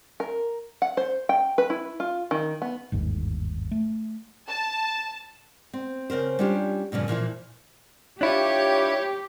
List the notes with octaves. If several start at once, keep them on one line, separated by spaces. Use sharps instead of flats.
A#4
F#5
C5
G5
B4
E4
F4
D#3
B3
G1 D#2 G#2
A3
A5
C4
C#3 C4 A#4 C5
G3 C#4 D4 F4 G4
G2 A#2 C#3 F3
A#2 E3 F3 E4
D4 E4 F4 G4 C#5